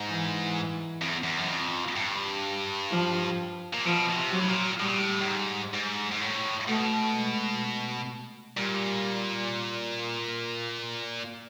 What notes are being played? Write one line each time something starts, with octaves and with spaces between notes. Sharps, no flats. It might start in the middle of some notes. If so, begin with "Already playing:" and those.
Already playing: G#2
E3
F2
E2
E2
F#2
F2
G2
F3
A#2
B2 F3
B2
C3
F#3
A2
A#2
A2 G3
A#2
A2
A2
G#2
G#2
G#2
A2
B2 A3
G#3
A#2 G3